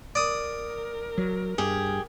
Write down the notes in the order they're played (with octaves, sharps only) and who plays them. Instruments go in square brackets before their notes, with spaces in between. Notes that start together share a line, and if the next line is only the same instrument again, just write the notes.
[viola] A#4 [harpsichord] D5 D#6
[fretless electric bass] F#3
[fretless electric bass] G2 [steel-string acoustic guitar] G4 G#4